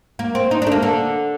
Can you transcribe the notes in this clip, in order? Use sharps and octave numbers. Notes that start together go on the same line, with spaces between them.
A#3
C4
D#4
A3 D4
A#3
D3